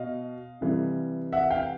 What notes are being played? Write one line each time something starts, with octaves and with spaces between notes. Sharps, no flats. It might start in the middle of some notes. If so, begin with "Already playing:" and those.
Already playing: B2 D#5 F5
C3 E3 G3
E5 F#5
F5 G5